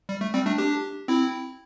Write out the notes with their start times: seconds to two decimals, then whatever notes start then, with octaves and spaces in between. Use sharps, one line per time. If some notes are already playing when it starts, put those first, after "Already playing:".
0.09 G3
0.21 A3
0.34 G3 C4
0.46 A3 D4
0.58 D4 G4
1.08 C4 E4